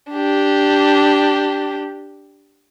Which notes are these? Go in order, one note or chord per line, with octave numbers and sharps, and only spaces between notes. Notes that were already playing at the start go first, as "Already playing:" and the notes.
D4 G4